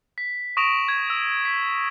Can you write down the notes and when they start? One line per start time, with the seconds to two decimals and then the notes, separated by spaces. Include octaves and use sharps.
0.18 B6
0.57 C#6 D#6 A#6 D7 E7 F7
0.88 G#6
1.08 E6 F7
1.45 B6